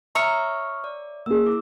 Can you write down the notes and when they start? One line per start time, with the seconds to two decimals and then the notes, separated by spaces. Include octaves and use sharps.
0.15 C#5 E5 A#5 C#6 D#6 F6
0.84 D5
1.26 A#3 G#4 E6
1.46 E4 D6